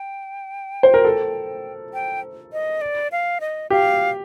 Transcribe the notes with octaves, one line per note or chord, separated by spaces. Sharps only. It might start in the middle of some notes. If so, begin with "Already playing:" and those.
Already playing: G5
C5
A#4
A4
G5
D#5
D5
F5
D#5
G4 F5